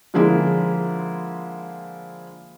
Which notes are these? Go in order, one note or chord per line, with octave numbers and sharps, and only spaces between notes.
D3 F3 G#3 A#3 E4